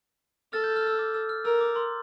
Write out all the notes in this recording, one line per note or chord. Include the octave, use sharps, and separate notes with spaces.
A4 F6 A6
G6
F6
E6
D6
E6
F6
A#4 E6
D6
C6